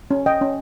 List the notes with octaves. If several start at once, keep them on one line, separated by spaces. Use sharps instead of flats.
C#4
D#5 G5
C#4